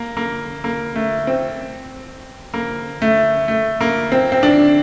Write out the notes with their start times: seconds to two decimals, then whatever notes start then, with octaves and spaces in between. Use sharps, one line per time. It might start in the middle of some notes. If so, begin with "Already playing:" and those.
Already playing: A#3
0.17 A#3
0.64 A#3
0.96 A3
1.27 C4
2.54 A#3
3.02 A3
3.48 A3
3.81 A#3
4.12 C4
4.32 C4
4.43 D4